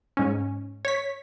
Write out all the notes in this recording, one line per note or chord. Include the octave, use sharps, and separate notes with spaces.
G#2 C#4
C#5 B6